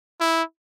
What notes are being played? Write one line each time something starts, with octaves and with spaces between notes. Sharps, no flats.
E4